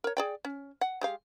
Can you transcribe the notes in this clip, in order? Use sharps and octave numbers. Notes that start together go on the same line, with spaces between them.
A#4 C#5
G#4 D5 G5
C#4
F#5
G#3 G4 F5